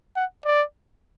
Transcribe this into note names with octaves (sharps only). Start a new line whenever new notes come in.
F#5
D5